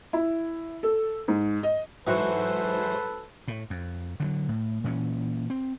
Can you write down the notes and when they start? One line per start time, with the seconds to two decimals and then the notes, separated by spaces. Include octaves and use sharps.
0.13 E4
0.83 A4
1.28 G#2
1.63 D#5
2.07 G#2 E3 F#3 F#4 A4 B4 C5
3.48 A2
3.70 F2
4.20 D3 E3 F#3
4.48 A2
4.84 A#2 E3 A3 C#4
5.50 C4